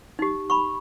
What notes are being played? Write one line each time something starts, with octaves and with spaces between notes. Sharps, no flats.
D#4 G4
B5 C#6